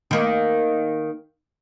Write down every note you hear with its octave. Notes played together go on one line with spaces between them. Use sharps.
D#3 A#3